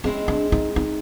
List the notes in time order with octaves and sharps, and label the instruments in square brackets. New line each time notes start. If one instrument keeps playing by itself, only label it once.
[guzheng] G#3 C4 E4 [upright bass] C#4
[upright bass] D4
D#4
D#4